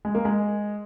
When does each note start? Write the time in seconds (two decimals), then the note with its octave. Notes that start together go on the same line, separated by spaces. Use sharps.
0.05 G#3
0.15 A#3
0.25 G#3